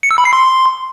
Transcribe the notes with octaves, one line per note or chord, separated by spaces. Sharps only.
C#7
E6
B5
C7
C6